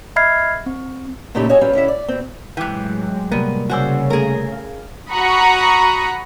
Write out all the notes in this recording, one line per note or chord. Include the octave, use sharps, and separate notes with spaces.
D#5 E5 B5 F6 G#6 C7
C4
A#2 C#3 A3 D#4 E4 G4
F#4 C#5 D#5 E5 G#5
F#3 G3 C4 C#4 F4 B4
D3 C#4 E4 E5
D5
B2 C4
A2 C3 E3 F#3 G#3 G5 D6 F#6
C3 G3 A#3 B3
C#3 F#4 C5 D5 F#5 G#5 E6
A3 G#4 A#4
F5
F#4 F#5 A#5 B5 C#6 D#6